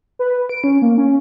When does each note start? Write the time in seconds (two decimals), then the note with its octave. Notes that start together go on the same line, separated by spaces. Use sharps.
0.19 B4
0.49 D7
0.64 C#4
0.82 A#3
0.98 C#4